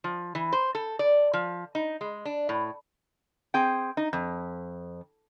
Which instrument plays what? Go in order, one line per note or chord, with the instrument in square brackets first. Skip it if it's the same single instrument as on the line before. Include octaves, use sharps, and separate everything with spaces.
[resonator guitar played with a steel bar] F3
E3
C5
A4
D5
F3
D#4
G#3
D4
A2
C4 G#4 G5
D#4
F2